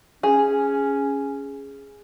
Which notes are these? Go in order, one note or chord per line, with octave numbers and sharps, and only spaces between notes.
C#4 G#4